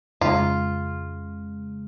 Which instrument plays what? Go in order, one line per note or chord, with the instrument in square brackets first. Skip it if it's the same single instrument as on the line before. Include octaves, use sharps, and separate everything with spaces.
[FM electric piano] F2 C#3 G#3 [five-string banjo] F4